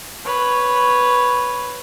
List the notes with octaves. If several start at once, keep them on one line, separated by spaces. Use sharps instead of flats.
B4 C#5